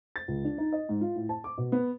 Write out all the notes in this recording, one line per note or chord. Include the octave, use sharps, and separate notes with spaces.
A6
C#2
D4
D#4
D#5
G#2
F4
A2
A5
D6
B2
B3